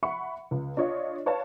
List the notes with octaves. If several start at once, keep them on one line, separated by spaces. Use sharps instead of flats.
E5 F#5 B5 C#6 C#7
C#2
D4 F4 C#5 D#5
B4 C#5 D5 F5 A5